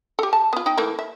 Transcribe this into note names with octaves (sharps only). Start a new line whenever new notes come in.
G4 A4
A5
B3 F4
D#4 G5
E3 A3 A#3
E5